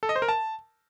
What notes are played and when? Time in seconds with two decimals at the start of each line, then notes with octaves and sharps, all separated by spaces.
0.03 A4
0.09 D#5
0.16 C5
0.22 A#4
0.28 A5